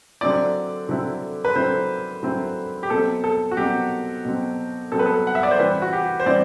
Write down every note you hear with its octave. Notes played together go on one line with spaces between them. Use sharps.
D3 F#3 C4 E4 D5
D3 F#3 C4 E4
B4
D3 F#3 C4 E4 C5
D3 F#3 C4 E4
G4
B2 F#3 C4 A4
A4
F#4
B2 F#3 C4 G4
B2 F#3 C4
B2 F#3 C4 A4
B4
A4
F#5
E5
D5
C5
E3 G3 C4 E4 B4
F#4
G4
C5
E3 G3 C4 E4 D5